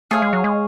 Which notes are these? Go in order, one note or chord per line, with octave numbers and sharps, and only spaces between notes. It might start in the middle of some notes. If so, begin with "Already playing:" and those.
A3 G#4 C#5 F5
G#3
F#3
G#3